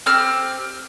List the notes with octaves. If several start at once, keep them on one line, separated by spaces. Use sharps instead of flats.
C4 G4 F6